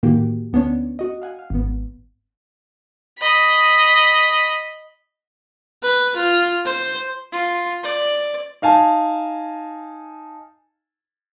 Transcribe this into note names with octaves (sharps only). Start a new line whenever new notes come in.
A2 D#3 E3 A#3 F#4 G4
D2 B3 C#4 D4 C#5
F#4 D#5
F5 F#5 G#5
F5
G#1 B3
D#5 B5
B4
F4
C5
F4
D5
D#4 F5 G#5 A5